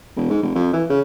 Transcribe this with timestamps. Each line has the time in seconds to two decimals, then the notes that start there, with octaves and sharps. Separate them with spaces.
0.16 E1
0.30 G#2
0.43 F1
0.55 F2
0.73 E3
0.90 C#3